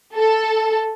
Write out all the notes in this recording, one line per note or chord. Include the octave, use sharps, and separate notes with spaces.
A4